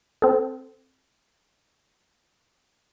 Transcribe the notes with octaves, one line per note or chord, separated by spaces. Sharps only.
C4 A4